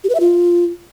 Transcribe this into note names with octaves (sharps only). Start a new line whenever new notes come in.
G4
B4
E5
F4